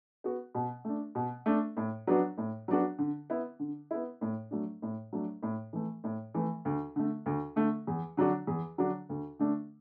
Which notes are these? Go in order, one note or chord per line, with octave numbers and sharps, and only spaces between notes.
B3 F#4
B2
A3 D4
B2
A3 D4
A2
F#3 B3 D4 F#4
A2
F#3 B3 D4 F#4
D3
B3 E4
D3
B3 E4
A2
F#3 A3 D4
A2
F#3 A3 D4
A2
E3 A3
A2
E3 A3
D2
D3 A3
D2
D3 A3
E2
D3 F#3 D4 F#4
E2
D3 F#3 D4 F#4
D2
D3 A3 D4